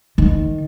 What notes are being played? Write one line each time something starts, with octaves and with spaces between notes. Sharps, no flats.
D#3